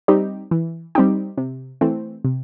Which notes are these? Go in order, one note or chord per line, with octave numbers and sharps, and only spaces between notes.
G3 C4 D#4 G4
E3
G3 C4 D#4 G4
C3
E3 A3 C4
C3